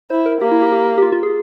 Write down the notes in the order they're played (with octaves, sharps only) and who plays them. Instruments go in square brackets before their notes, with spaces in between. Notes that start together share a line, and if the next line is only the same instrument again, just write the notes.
[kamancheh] E4 [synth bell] C5
[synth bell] A#4
[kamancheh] A#3 [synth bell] G4
[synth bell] E4
G4
G4
G4
F4
F4
G#4